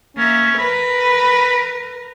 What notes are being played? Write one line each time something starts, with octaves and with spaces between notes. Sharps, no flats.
A#3 C#4 E5
A#4 B4 B5